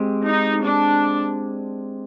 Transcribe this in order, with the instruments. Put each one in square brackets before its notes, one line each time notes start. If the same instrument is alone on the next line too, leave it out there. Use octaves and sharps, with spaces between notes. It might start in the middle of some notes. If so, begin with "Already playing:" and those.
Already playing: [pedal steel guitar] G#3 C4 G4
[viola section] D#4
D4